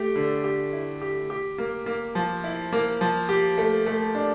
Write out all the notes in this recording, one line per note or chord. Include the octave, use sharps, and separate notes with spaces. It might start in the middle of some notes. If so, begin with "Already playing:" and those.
Already playing: A3 G4
D3
G4
E4
G4
G4
A#3
A#3
F3
E4
A#3
F3
G4
A3
A3
D4